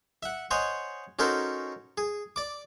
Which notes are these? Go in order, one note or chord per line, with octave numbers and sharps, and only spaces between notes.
E5 F#5
C5 C#5 D#5 F#5 G#5
C#4 D#4 F#4 A4 A#4 C5
G#4
D5 D6